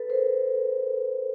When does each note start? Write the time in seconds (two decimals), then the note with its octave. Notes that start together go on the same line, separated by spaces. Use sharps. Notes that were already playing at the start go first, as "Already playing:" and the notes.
Already playing: A4 B4
0.10 A#4 C5